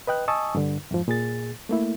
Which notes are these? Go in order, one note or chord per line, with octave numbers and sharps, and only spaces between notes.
B4 D#5 G5 F#6
D#5 G#5 A5 C#6 D#6 E6
G2 D3
F2 G#2 F3
A#2 G#4 A6
A3 A#3 E4